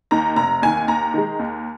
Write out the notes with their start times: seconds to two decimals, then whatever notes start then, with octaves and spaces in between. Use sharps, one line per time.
0.11 D#2 D#3 A#5
0.36 F1 A#5
0.62 D#2 D#3 G#5
0.87 D#2 A#5
1.14 D#3 G#3
1.39 D#2